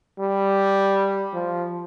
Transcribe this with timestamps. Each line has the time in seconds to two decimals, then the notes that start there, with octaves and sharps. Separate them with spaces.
0.20 G3
1.33 F3